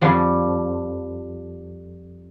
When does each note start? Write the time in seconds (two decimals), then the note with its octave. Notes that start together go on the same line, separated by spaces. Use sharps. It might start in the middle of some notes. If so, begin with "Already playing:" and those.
0.01 F2 F3 G3